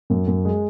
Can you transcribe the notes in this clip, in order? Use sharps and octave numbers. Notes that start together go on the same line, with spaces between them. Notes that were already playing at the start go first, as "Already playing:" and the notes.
F#2
F#2
G#3